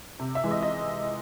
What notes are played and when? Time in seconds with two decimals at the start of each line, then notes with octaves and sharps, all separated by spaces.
0.19 C3
0.35 E5
0.44 E3 G#3
0.51 D#5
0.62 D#5